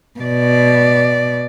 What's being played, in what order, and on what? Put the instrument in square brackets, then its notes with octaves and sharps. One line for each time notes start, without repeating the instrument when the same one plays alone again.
[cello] B2 D5